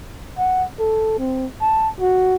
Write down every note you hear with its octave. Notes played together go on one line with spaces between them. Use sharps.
F#5
A4
C4
A5
F#4